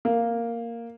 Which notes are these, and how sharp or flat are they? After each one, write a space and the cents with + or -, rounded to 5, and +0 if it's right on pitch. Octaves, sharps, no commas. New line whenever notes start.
A#3 -5